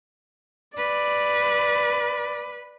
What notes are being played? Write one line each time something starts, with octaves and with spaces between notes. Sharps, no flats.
B4 D5